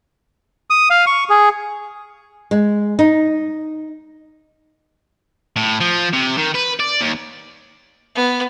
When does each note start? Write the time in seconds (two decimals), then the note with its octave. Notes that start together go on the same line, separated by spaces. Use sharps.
0.70 D#6
0.90 F5
1.06 C#6
1.30 G#4
2.51 G#3
2.99 D#4
5.56 A2
5.81 F3
6.13 C3
6.37 D#3
6.54 B4
6.79 D5
7.01 D#2
8.15 B3